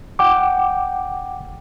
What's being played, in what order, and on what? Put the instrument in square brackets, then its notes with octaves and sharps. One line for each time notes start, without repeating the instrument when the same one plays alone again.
[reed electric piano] F#5 G5 D6